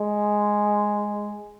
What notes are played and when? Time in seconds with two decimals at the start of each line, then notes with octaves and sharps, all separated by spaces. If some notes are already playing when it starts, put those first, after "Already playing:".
Already playing: G#3